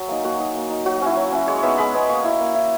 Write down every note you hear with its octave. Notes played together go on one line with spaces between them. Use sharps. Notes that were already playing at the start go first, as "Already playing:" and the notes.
Already playing: F#3 G#5
A#3 D#4
A#3 F#4
D#4
A#3
D#4
F#3 F#4
C#4 E4
F#3
C#4 E4
G#3 C#5
B3 D#4 E5
G#3 B5
B3 D#4
A#3 C#6
E4
A#3
E4